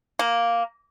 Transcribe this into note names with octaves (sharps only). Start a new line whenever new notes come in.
A#3